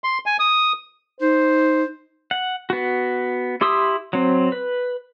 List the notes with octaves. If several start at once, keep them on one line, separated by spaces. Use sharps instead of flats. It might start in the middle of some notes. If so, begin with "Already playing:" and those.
C6
G#5
D#6
D#4 C5
F#5
B3 F#4
E4 G4 C6 D#6 E6
F#3 C4
B4